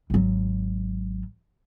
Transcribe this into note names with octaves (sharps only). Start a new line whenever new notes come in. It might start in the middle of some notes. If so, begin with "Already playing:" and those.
G#1 F#3